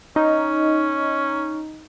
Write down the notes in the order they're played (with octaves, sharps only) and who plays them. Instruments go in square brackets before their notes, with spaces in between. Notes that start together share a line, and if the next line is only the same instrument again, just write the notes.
[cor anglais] C#4 [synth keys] D#4